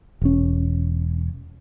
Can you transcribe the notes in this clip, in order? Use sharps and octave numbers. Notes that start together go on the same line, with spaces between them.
E1 C#4